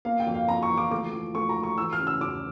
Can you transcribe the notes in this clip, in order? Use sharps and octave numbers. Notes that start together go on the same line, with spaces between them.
A#3 F5
G5
F2
F5
F2 A#5
C#6
E3
D6
A3 D6
F3
A3 C#6
A#5
F3
C#6
E3 E6
F6
C#3
E6
E2 D6